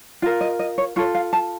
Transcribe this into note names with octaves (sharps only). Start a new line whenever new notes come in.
F4 A#4 F5
D#5
D#5
C#5
F4 A4 C#5
F5
A5